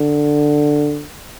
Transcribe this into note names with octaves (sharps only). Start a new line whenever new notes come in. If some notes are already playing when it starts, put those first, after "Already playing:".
Already playing: D3